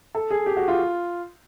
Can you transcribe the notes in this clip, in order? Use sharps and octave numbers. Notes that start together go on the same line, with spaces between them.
A4
G#4
G4
F#4
F4